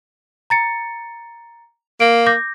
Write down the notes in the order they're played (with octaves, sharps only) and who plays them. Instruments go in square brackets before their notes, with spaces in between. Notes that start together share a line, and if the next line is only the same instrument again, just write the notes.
[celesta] A#5 A6 C#7
[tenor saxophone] A#3 [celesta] D7
[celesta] D6 G6 A#6